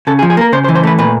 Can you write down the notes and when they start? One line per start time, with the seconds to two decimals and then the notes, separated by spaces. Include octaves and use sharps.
0.07 C#3 A4
0.19 G#4
0.22 F3
0.30 G#4
0.37 A#3 A#4
0.52 C#3 C5
0.64 C5
0.68 E3
0.75 C5
0.83 A3 B4
0.98 A#2 B4